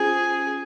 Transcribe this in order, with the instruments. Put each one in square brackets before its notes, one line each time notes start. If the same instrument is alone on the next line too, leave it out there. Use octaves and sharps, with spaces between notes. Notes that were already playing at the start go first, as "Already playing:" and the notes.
Already playing: [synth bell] C#4 F4 C5 [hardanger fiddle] G#4